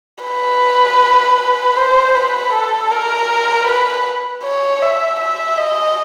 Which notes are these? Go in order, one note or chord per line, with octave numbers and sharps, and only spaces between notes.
B4
C5
B4
A4
A#4
B4
C#5
E5
E5
D#5